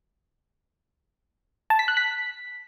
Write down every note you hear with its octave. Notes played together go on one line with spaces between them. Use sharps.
A5
B6
F#6
B6